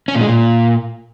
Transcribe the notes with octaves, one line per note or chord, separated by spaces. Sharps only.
C#4
A#2
G#3
A#2